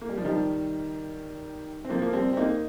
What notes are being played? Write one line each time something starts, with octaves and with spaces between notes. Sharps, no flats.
A#3
G3
F3
D#3 G3
C4
F3 A#3
A#3
G3 C4
C4
A#3 D#4